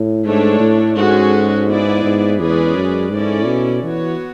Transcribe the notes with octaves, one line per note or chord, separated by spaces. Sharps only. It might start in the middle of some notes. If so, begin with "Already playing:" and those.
Already playing: A2
G#2 A3 D4 A4 C#5
A2
G#2 G#3 C#4 F#4 A4
B3 E4 G#4 B4 D5
G#2
E2 G#3 C#4 G#4 B4 D5
F#2
G#2 C#4 E4 A4 D5
B2
E3 B3 F#4 C#5